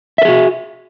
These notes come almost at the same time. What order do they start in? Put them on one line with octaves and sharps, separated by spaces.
E5 A#4 G#4 F#4